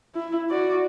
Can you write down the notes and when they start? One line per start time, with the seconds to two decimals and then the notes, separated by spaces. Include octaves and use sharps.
0.15 E4
0.50 F#4 D5